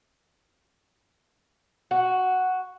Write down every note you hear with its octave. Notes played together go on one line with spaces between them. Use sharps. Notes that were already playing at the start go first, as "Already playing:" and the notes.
F#4